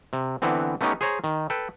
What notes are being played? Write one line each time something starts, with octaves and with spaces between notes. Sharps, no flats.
C3
D3 E3 B3 C4
A3 B3 C#4 D#4 G4
G#4 C5 C#5 A#5
D#3
A4 B4 G5